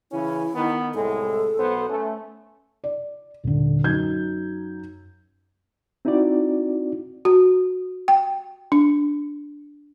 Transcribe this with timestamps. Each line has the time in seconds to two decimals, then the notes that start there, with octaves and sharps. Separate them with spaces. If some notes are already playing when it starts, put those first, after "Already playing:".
0.12 C#3 E3 C#4 E4
0.54 D#3 B3
0.94 C2 A2 G#3 A4
1.59 B1 B3 C5
1.89 A3 C#4
2.84 D5
3.44 D#1 D3
3.84 F#2 D#4 G6 G#6
6.05 C4 D#4 E4 F#4 D5
7.25 F#4
8.08 G5
8.72 D4